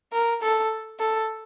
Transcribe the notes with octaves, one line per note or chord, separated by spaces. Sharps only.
A#4
A4
A4